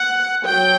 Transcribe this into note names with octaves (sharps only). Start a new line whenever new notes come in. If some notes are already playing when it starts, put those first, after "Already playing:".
Already playing: F#5
F#3 G5